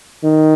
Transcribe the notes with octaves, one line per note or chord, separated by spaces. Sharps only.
D#3